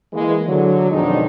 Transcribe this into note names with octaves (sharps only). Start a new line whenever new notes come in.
E3 G#3 A#3
D3 F#3
F2 B2 D#3 G#3 D4 D#4